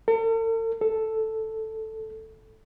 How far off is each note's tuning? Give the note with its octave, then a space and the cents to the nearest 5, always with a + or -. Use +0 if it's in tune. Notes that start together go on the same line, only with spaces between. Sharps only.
A4 +45
A4 +0